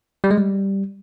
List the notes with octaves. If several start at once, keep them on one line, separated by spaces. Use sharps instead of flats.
G3
G#3
G3